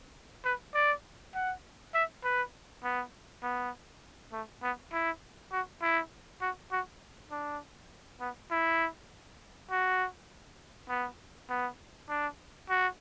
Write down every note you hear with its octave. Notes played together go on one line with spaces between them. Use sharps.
B4
D5
F#5
E5
B4
B3
B3
A3
B3
E4
F#4
E4
F#4
F#4
D4
B3
E4
F#4
B3
B3
D4
F#4